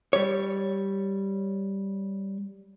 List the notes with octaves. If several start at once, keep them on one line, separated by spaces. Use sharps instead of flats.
G3 C#5